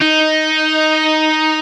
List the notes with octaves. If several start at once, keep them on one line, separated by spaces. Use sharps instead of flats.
D#4